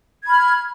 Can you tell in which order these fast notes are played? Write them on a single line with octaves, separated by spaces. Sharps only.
G#6 B5 F6